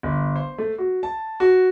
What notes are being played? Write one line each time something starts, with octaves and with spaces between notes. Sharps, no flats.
G1
C5
A3
F#4
A5
F#4